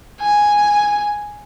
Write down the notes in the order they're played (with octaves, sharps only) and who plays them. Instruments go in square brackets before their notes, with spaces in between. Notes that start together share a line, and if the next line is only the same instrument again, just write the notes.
[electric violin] G#5